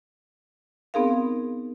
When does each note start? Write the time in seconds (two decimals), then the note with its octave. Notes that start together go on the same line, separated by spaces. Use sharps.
0.94 B3 C4 D#4 G#4 A#4 F5